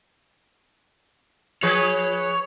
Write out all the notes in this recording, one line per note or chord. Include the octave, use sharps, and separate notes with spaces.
F3 G#4 B4 C#5